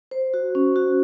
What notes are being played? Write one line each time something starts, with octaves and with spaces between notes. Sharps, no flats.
C5
F#4
C#4
F#4